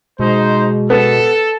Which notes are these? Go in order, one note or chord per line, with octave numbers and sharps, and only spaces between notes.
B2 G#3 D#4 C5
B3 A4